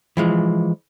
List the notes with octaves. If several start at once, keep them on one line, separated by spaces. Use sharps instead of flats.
E3 F3 G#3